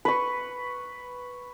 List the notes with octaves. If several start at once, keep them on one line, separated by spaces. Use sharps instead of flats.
B4 C#6